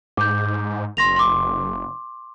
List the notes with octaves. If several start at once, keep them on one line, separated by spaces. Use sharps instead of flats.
G#2 D6 G6
F#1 C6 A#6 F7
C6 D6